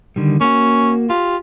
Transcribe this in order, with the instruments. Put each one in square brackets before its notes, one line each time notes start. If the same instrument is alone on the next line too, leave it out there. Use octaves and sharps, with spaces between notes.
[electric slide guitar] D3 D#3 G3
[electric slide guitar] A#3 F#4 [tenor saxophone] C#4
[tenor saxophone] F4 [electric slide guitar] G4